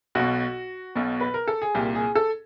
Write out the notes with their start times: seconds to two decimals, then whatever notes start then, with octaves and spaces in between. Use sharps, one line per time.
0.15 B1 B2 F#4
0.96 B1 B2
1.20 B4
1.34 A#4
1.48 A4
1.62 G#4
1.75 C2 A#2 G4
1.95 G#4
2.15 A4